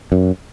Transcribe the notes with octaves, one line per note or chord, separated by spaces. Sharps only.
F#2